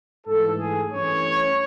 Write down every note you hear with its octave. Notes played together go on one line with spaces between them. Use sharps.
G#2 E3 A3 A4
G#4
G2 E3 A3 C#4 C#5